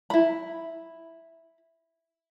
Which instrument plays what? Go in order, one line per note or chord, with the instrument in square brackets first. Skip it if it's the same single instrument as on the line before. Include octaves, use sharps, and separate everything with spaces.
[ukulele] E4 B5